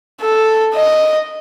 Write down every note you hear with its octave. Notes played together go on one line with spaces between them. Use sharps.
A4
D#5